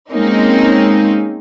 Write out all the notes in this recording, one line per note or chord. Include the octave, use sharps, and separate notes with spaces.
G#3 A#3 C4 C#4 D#4